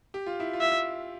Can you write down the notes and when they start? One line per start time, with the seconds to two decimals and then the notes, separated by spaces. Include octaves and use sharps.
0.14 G4
0.26 F4
0.40 E4
0.53 F4
0.61 E5